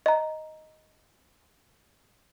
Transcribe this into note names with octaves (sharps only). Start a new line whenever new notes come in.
D#5 A#5